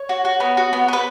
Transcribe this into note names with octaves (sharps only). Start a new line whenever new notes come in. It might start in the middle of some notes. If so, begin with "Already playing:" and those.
Already playing: C#5
F#4
F#4
B3
F#4
B3
B3 B4